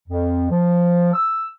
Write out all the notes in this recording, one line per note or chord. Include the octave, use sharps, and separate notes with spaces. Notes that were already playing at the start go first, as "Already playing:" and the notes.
F2
F3
E6